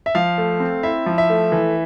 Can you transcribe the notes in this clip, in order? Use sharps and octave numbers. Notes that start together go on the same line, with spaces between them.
E5
F3 F5
A3
C4
E4 E5
F3
E5
A3
E3